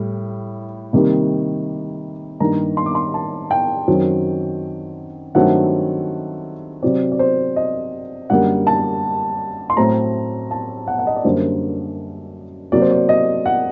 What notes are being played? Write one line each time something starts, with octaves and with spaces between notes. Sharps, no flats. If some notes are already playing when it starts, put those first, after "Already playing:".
Already playing: A2 G3
C3 D#3 G3 A#3
G2 D#3 G3 A#3 A#5
C6
D6
C6
A5
G5
F#2 D#3 F#3 C4
G2 D#3 F#3 A3 C4 F#5
C3 F#3 C4 D5
D5
C5
D#5
F#2 D3 G3 A#3 F#5
A5
C6
A2 F#3 A3 C4 A#5
A5
F#5
F#5
D#5
D5
F#2 D3 G3 A#3 C5
C3 F#3 A#3 D5
C5
D5
D#5
F#5